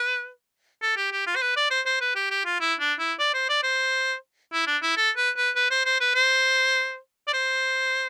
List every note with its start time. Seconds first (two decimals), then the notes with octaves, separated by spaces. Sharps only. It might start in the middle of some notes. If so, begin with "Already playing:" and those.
Already playing: B4
0.82 A4
0.97 G4
1.12 G4
1.27 F4
1.36 C5
1.42 B4
1.57 D5
1.71 C5
1.86 C5
2.01 B4
2.16 G4
2.31 G4
2.46 F4
2.61 E4
2.80 D4
3.00 E4
3.19 D5
3.34 C5
3.49 D5
3.63 C5
4.53 E4
4.67 D4
4.83 E4
4.97 A4
5.17 B4
5.37 B4
5.56 B4
5.71 C5
5.86 C5
6.00 B4
6.15 C5
7.28 D5
7.34 C5